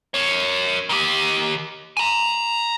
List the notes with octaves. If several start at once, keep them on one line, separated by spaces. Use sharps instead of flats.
A#4 C#5
D#3 G4
G#5 A#5